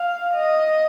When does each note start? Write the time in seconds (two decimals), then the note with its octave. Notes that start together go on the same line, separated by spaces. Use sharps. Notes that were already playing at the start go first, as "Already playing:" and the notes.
Already playing: F5
0.34 D#5